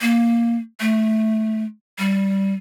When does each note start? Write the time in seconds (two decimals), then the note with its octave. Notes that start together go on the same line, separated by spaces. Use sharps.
0.02 A#3
0.80 A3
1.99 G3